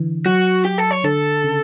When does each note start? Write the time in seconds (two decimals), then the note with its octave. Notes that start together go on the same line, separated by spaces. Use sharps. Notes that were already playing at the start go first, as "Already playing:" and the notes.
Already playing: D3 E3
0.25 F#3 F#4
0.65 G4
0.78 A4
0.91 C#5
1.04 D3 A4
1.44 C#3